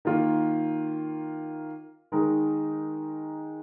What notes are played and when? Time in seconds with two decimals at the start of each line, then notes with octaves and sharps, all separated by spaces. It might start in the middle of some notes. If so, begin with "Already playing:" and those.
0.05 D#3 A#3 F4
2.12 D#3 G#3 D#4 A#4